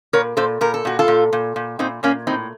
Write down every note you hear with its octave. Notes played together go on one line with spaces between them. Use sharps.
A#2 A#4 C#5
A#2 A4 C5
A#2 A#4
A4
A#2 F#4
F4 A4
A#2
A#2
A#2
A#2 C4 D#4
A#2 A#3 C#4
A2 C4 D#4